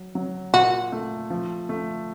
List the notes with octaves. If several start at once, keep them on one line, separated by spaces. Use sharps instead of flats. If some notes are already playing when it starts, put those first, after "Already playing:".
Already playing: F#3
F#3
A#2 F#4
A3
F3
A3